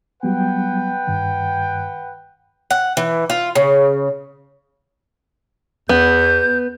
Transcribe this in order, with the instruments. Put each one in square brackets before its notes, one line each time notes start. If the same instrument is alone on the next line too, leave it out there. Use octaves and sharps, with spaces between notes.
[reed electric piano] F#3 G3 B3 [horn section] B4 F#5 G5
[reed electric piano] G2 D#3
[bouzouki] F#5
E3
F4
C#3
[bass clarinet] E2 [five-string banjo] B3 [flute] G6